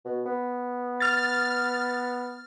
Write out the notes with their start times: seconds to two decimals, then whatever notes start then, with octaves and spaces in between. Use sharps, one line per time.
0.05 B2
0.26 B3
1.00 F6 A6